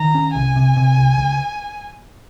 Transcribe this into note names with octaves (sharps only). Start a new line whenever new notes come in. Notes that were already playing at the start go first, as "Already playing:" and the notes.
Already playing: D#3 A#5
C#4
C2 G#5
C3
C3
C2
C#2